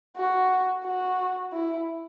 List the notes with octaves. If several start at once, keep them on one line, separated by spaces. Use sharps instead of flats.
F#4
F#4
E4